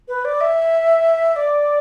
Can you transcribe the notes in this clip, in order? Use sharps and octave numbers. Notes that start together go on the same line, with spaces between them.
B4
D5
E5
D5